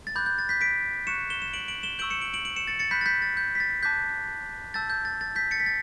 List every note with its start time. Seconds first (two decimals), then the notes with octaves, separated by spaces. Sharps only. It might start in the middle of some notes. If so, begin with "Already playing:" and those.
0.07 A6
0.15 B5 D6 F#6 G6
0.26 G6
0.38 A6
0.49 G6 B6
0.61 B6 D7
1.07 C#6 F#6 C#7 E7
1.30 E7 G7
1.42 E7
1.53 D7 F#7
1.68 D7 F#7
1.83 E7 G7
1.99 C#6 E6 G6 D7 F#7
2.10 C#7 E7
2.21 D7 F#7
2.34 D7 F#7
2.45 D7 F#7
2.56 C#7 E7
2.67 A6 C#7
2.79 A6 C#7
2.91 B5 F#6 G6 B6
3.01 A6
3.06 G6 B6
3.22 A6
3.37 G6
3.55 B6
3.60 A6
3.83 A5 D6 F#6 G6 B6
4.74 A5 E6 G6 A6
4.90 G6
5.05 A6
5.21 A6
5.36 G6 B6
5.51 A6 C#7
5.60 B6
5.66 A6